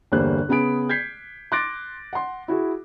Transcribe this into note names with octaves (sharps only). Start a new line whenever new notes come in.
G1 E2 G3 A#3 C5 F#6
C#3 B3 G#4 B5 D7
G6 G#6 B6 C7
C6 D6 F#6 A6 A#6 D7
F#5 C6
E4 F#4 G#4